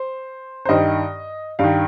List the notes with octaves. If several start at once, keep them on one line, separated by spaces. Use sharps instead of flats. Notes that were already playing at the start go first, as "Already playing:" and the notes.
Already playing: C5
C5
G2 D#3 D#5
G2 D#3 F5